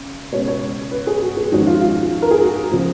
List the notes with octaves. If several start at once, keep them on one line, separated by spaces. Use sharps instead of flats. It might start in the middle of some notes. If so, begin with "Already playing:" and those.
Already playing: C#3
B2 G#3 C#4 C#5
C#5
B4
G#4
F#4
G#4
F2 D#3 G#3 C#4 F#4
F4
F4
A#4
G#4
F#4
C#3 F3